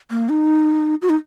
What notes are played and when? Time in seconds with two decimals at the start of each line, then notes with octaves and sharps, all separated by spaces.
0.11 A#3
0.29 D#4
1.02 F#4
1.09 D#4